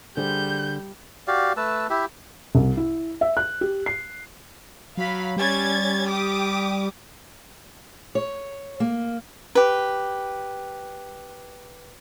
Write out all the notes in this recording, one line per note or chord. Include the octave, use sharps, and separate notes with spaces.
D3 G3 G#4 C5 G6
F#4 G4 D5 F5
A3 B4 A5 E6
E4 G4 E5
C2
E4
E5
F#6
G4
C7
F#3 F5 B5
G3 C#4 G#6 A6
G4 D6 D#6
C#5
A#3
G4 B4